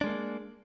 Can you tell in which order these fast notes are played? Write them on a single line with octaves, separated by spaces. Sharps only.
D4 G#3 A#3